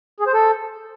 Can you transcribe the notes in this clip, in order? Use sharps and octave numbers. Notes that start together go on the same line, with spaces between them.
G#4
C5
A4